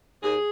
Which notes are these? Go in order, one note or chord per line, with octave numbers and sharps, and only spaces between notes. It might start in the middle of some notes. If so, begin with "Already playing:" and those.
D#2 G#4